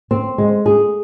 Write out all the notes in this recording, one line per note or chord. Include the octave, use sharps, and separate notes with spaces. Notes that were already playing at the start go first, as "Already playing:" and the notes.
C4
G#3
G#4